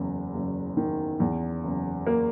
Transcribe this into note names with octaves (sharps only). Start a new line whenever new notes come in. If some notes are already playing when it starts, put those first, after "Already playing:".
Already playing: F#1 E2
F#1
D#3
E2
F#1
A#3